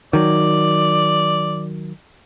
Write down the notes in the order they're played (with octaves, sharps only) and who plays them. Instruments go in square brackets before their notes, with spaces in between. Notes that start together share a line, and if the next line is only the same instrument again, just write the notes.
[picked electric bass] D#3 F#3 [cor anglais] D5